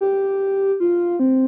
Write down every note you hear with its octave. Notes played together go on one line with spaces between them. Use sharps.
G4
F4
C4